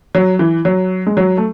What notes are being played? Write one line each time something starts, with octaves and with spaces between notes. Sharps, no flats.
F#3
E3
F#3
G#3
F#3
A3